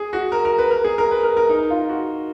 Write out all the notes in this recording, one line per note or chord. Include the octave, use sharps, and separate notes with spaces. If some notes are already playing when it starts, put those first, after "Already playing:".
Already playing: G#4
F#4
A#4
A#4
B4
A#4
G#4
A#4
B4
A#4
A#4
D#4
F4
F#4